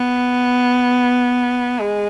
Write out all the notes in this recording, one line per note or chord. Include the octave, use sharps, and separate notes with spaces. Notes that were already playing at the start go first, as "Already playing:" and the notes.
Already playing: B3
G#3